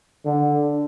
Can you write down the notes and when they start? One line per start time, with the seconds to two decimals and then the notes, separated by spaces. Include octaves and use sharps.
0.25 D3